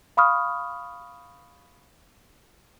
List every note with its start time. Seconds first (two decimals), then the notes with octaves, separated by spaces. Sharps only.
0.17 F5 B5 C#6 D#6 F6